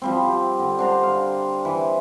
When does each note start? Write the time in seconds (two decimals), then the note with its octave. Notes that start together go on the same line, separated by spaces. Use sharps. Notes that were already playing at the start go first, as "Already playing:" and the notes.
0.02 F3 G3 C4
0.23 G4
0.59 D3
0.79 D4 C5 A#5
1.03 F5
1.65 E3